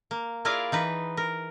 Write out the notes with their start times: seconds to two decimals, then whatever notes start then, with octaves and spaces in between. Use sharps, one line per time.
0.11 A#3
0.45 E4 F4 G#4 A#4 D5 F5
0.72 E3 D#4 B4
1.17 A#4